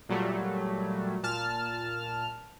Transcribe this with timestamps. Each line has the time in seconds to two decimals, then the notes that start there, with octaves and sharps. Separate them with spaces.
0.09 A#2 F#3 G3 A3
1.23 A#2 A5 F6